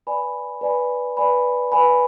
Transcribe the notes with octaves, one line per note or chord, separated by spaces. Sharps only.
B4 D5 G#5 B5
B4 D5 G#5 B5
B4 D5 G#5 B5
B4 D5 G#5 B5